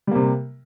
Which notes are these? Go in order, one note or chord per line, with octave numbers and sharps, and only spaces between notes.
C3 G3 A#3